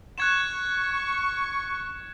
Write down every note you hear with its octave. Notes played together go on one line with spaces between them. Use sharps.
C#6 F#6 G#6 E7